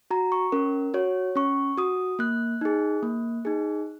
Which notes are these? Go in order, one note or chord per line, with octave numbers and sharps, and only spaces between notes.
F#4 A#5
C#6
C#4 A#4
F#4 C#5
C#4 C#6
F#4 D#6
A#3 F#6
D#4 G#4
A#3
D#4 G#4